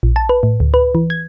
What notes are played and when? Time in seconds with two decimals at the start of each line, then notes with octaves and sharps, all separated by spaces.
0.03 A#1
0.16 A5
0.29 B4
0.43 A2
0.60 D2
0.74 B4
0.95 E3
1.10 G#6